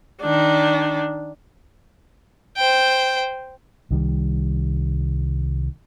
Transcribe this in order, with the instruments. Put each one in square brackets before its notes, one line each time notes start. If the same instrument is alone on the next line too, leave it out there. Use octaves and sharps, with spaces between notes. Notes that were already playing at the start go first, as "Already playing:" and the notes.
[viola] D#3 D4
[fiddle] C5 G5
[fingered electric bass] C2 D#3 G3